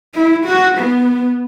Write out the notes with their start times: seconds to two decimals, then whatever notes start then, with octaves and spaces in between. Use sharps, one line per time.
0.14 E4
0.45 F#4
0.78 B3